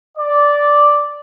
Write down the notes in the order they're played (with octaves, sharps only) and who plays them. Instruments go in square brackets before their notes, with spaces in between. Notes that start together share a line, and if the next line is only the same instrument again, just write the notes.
[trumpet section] D5